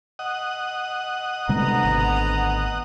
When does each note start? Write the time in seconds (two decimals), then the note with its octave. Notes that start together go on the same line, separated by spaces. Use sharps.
0.19 D#5 F#5
1.49 D2 C3 G3 G#3 B3 A#5
1.84 G#1